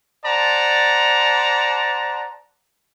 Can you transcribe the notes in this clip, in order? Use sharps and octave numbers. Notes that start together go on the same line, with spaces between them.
C5 D5 F#5 A5 A#5